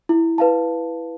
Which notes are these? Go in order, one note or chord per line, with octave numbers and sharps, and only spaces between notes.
E4
B4 F5 A5